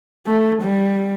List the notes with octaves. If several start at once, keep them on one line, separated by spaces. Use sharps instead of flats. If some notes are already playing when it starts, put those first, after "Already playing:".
A3
G3